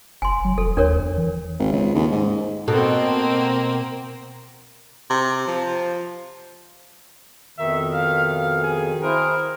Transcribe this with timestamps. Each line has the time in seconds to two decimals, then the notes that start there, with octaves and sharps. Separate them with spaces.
0.22 F#1 G#5 C6
0.45 F#3
0.58 F1 A4
0.77 D#2 D4 A#4 C#5
1.00 E2
1.17 E3
1.59 G#1
1.72 C#2
1.95 D#2
2.12 G#2
2.68 B2 A#3 C4 A4
5.10 C3
5.48 F3
7.59 F2 B2 D#3 E5
7.94 F5
8.31 F5
8.63 G#4
9.03 E4 G#4 A#4 C5